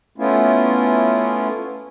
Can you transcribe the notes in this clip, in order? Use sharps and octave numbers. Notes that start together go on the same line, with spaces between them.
A3 B3 C#4 E4 F4